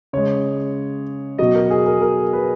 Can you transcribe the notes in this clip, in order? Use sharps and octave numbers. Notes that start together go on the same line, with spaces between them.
C#3 G#3 C#5
B2 F#3 D#5
A#4
G#4
A#4
A#4
B4